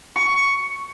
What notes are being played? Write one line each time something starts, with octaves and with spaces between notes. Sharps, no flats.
C#6